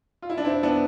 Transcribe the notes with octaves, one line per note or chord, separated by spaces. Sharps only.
F4
E4
D4
C4 E4
B3 D4